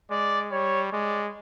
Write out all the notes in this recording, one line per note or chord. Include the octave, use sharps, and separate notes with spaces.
G#3 D5
G3 C#5
G#3 D5